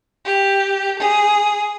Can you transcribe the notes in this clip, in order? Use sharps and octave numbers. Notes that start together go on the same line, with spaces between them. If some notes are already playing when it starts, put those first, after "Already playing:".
G4
G#4